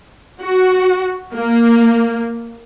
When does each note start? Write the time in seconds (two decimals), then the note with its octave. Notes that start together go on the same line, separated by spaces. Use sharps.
0.41 F#4
1.34 A#3